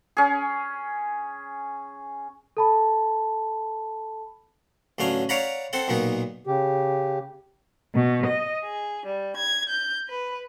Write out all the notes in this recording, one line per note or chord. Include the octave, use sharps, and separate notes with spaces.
C#4 G#4
A4 A5 B5
A1 D3 F#3 F5 G#5
C#5 D5 F5 F#5 A#5 B5
C4 A4 F#5
B1 A#2 B3 D#4
C#3 G4
B2
D#5
G#4
G3
G#6
G6
B4